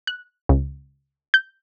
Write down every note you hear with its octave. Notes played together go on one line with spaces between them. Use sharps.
F#6
C#2
G6